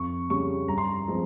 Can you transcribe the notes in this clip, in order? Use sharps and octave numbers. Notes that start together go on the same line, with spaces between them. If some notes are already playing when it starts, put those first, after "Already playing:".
Already playing: F2 C#6
C#3 G3 C#4 C#6
G2 A#5
C6
A#5
F3 G#3 C4